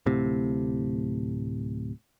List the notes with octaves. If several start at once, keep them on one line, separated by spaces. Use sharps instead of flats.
D1 A2 C3